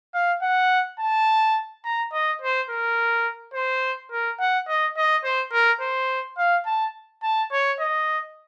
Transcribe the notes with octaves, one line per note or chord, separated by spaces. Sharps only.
F5
F#5
A5
A#5
D#5
C5
A#4
C5
A#4
F#5
D#5
D#5
C5
A#4
C5
F5
A5
A5
C#5
D#5